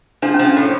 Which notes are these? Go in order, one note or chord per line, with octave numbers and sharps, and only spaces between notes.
F3 D4
C#4
F3
D4
A2